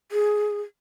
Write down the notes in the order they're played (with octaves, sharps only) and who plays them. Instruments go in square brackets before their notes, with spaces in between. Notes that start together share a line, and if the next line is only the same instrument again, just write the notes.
[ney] G#4